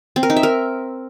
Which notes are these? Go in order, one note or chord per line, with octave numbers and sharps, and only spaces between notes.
C4
A#4
D#4
E5
A#4